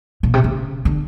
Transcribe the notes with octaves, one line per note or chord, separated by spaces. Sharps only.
A#2
C3
C#3
D3